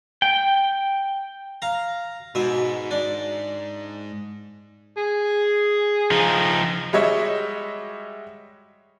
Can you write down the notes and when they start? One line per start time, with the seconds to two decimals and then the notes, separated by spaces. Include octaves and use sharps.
0.22 G5
1.62 F5 A#5
2.35 G#2 B2 E5
2.91 D4
4.97 G#4
6.11 F3 D#4
6.93 G3 G#3 F#4 C#5 D#5 E5